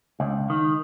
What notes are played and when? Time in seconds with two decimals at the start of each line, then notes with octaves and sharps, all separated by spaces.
0.20 C#2
0.50 D#3